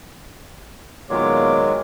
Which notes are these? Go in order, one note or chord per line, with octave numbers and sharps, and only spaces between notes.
A#2 D#3 F#3 G#3 B3 F4 C#5 D6